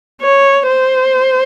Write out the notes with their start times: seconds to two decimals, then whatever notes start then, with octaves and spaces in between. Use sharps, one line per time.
0.22 C#5
0.67 C5